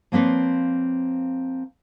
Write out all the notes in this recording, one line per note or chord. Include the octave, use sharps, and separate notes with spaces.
F3 A#3 C4 B4 C#5